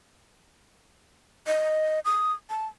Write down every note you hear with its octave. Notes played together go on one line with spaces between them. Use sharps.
D#5
D#6
A5